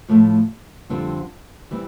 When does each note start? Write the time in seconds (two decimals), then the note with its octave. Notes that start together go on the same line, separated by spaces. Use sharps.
0.09 A2 F3 A3
0.90 F2 D3 G3 C4 F4
1.71 E3 G3 C4